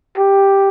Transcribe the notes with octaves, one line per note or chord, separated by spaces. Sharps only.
G4